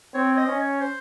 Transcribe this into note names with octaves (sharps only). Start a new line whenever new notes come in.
C4 C#5
C#5
D#5
C#4
C#5
C5